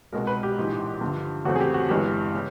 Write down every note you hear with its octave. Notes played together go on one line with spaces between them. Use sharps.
C2 B2 G#3 A#4
B4
G4
A#1 G#2 E3
G2 D3 F3
E2 C#3 F#3 A3 C4 F#4
G#4
G4
F#4
G1 G2 E3 G#3 B3 G4
C#3